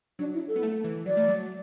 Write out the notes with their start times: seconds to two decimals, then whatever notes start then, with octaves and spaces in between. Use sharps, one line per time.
0.19 F#3 D4
0.34 E4
0.48 A4
0.56 B3
0.63 A3
0.84 E3
1.06 F#3 D5
1.17 A3
1.28 F#3